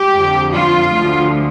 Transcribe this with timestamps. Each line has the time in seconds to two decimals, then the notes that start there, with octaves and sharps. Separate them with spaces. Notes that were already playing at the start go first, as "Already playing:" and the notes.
Already playing: G4
0.15 F2 D3 F3
0.53 F4
0.91 D2 D3 F3